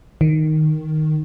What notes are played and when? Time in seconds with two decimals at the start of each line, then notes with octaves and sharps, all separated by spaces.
0.21 D#3